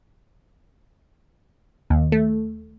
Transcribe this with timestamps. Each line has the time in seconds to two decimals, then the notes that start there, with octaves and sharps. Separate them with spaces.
1.90 D#2
2.12 A3